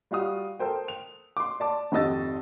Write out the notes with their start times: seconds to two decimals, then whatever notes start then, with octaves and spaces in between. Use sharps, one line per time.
0.11 G3 F4 F#4 F5 D#6
0.59 A4 A#4 C5 G5
0.88 F7
1.37 C6 D6
1.60 D5 A5 D6
1.92 G#1 F2 G4 D#5 E6 A6